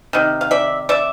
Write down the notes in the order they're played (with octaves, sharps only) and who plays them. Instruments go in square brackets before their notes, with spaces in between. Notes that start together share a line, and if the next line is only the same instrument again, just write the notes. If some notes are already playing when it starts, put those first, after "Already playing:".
[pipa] C3 D#3
F5
D5 E5
D5 E5